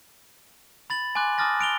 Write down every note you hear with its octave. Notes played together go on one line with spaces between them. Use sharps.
B5 A6 F#7
G#5 C6 D6 F#6 F#7
A5 D6 D#6 F6 A6 A#6
F#6 D7 F7 G7